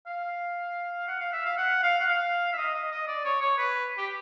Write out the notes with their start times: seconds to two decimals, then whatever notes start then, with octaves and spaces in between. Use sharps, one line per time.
0.07 F5
1.08 F#5
1.20 F5
1.33 E5
1.46 F5
1.57 F#5
1.83 F5
2.00 F#5
2.08 F5
2.53 E5
2.58 D#5
2.74 D#5
2.91 D#5
3.08 D5
3.25 C#5
3.41 C#5
3.58 B4
3.98 G4